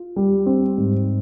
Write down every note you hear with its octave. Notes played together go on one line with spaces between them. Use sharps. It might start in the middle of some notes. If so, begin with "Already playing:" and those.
Already playing: F4
G3
C4
G#2